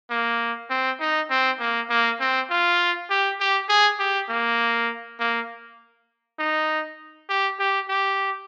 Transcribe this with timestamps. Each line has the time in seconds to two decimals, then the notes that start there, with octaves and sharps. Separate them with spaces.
0.10 A#3
0.70 C4
1.00 D#4
1.30 C4
1.60 A#3
1.90 A#3
2.20 C4
2.50 F4
3.10 G4
3.40 G4
3.69 G#4
3.99 G4
4.29 A#3
5.19 A#3
6.39 D#4
7.29 G4
7.59 G4
7.89 G4